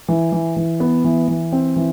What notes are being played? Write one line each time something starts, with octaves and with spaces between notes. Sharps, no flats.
E3
E3
E3
B3
E3
E3
C4
E3